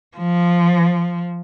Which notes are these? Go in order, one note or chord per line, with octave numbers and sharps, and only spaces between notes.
F3